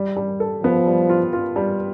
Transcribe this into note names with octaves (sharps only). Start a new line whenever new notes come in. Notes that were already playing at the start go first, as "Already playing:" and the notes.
Already playing: G3
G3
A4
F3 B3
G3
F4
F4
G3